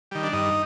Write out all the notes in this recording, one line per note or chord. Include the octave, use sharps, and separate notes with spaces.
D#3 G3
D4
G2 D#4